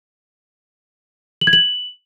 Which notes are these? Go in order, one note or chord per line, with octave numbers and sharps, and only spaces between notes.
F#7
G#6
F#7